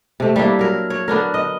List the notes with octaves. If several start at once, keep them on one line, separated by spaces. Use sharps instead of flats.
C3 A3
G3 A#3 D4 E4
F#3 A#4
C#5
D3 B3 D4 A#4
D#5